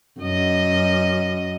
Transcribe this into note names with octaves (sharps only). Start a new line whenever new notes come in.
F#2 D#5